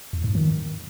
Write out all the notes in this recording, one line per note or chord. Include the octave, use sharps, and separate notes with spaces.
E2
G#2
D#3